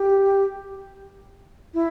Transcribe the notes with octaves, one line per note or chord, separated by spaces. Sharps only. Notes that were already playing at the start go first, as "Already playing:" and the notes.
Already playing: G4
E4